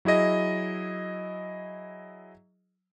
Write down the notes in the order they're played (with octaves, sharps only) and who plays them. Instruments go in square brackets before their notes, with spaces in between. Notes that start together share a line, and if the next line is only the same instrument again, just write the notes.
[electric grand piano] F#3 E4 G#4 D#5 A#6